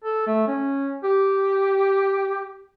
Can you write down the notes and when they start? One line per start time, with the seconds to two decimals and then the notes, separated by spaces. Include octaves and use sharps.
0.04 A4
0.27 A3
0.48 C#4
1.04 G4